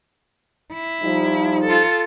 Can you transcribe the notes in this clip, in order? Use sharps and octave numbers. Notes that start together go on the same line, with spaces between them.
E4
F3 G3 D#4
F4 A4